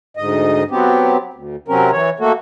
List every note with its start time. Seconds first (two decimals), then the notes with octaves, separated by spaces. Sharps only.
0.17 D2 G#2 D#5
0.71 F#3 B3 C4 G4
1.33 D2
1.68 C3 F#3 C4 C#4 A#4
1.92 E3 C#5
2.20 A3 A#3 F#4 A4